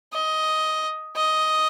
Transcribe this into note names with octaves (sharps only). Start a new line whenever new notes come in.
D#5
D#5